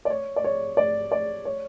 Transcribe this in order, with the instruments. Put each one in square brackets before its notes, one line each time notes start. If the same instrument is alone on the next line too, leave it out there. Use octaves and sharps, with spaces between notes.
[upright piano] D5
C#5
D5
C#5
D5
D5
C#5